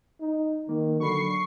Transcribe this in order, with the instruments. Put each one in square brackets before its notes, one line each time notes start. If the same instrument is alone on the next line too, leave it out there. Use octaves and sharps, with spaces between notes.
[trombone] D#4
[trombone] D#3 [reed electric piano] A#3
[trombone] D3 [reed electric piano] F#3 B5 [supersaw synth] C#6 C7